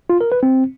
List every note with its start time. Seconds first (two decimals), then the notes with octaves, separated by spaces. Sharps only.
0.10 F4
0.21 A#4
0.32 B4
0.43 C4